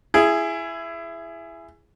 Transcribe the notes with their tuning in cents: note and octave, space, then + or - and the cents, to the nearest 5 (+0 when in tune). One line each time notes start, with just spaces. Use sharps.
E4 +20 G#4 +0